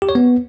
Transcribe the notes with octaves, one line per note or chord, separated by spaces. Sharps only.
G4
C#5
B3